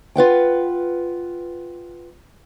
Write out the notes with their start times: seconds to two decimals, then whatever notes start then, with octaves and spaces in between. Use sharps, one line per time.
0.16 F4 B4 F#5 G5